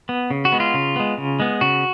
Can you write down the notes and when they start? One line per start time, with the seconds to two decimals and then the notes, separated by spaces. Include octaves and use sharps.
0.09 B3
0.31 C#3
0.45 F#4
0.52 G#3 B3
0.60 F4
0.74 C#3
0.96 G#3 B3
1.18 C#3
1.40 G#3 B3
1.61 C#3 F#4